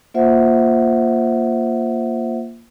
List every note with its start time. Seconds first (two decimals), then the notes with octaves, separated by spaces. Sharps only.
0.14 A#3 F4 C5 E5 F#5